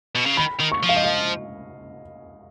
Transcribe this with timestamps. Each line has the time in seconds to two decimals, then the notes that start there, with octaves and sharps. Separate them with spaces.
0.15 B2
0.26 C#3
0.37 D#3 B5
0.60 D#3
0.72 C#6
0.83 F3
0.89 F5
0.96 D#5
1.04 F5